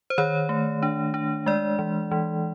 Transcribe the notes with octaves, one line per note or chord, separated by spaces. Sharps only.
C5
D#3 C#5
A3
D4
D4
G#3 D5
E3
E3